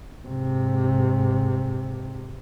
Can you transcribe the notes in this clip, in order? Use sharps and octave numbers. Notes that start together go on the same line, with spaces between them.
G#2 C3